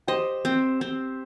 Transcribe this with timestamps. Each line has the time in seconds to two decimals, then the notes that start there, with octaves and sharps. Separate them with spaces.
0.07 G4 C5 D#5
0.45 C4
0.81 C4